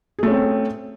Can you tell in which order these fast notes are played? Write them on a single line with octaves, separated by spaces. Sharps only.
G#4 A3 C#4 C4